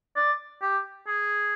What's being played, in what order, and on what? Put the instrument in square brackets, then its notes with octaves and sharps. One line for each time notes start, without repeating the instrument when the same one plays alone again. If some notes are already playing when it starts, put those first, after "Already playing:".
[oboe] D5
G4
G#4